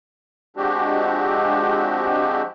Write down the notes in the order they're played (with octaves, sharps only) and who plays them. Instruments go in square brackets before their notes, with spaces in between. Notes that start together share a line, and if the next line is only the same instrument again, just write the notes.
[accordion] F3 G#3 C4 D4 F#4 G4